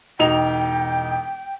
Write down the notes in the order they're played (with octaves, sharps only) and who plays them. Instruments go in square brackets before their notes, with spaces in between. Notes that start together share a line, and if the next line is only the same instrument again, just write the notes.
[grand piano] E1 D#4 F7 [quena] G5